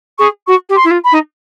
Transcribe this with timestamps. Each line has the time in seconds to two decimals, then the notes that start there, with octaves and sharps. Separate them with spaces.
0.19 G#4 C#6
0.47 F#4 C#6
0.69 G4
0.76 C6
0.84 E4
0.91 F4
1.04 B5
1.12 D#4